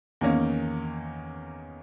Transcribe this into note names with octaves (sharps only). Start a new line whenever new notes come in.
E2 D#3 A#3 C#4